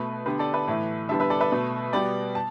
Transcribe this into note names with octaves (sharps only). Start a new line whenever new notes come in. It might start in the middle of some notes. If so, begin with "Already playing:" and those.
Already playing: B2 A3 B4
D3 B3 G4 B4
A4 D5
B4 E5
A2 E3 A3
D3 G3 B3 E5 A5
B4 E5
A4 D5
B4 E5
B2 A3
B2 G3 B3 D5 G5
A5